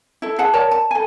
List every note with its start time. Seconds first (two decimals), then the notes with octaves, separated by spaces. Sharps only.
0.22 E4 A4
0.38 G#4 F#5 A5
0.53 A#4 C#5 D5 A5
0.71 A5
0.91 A4 G#5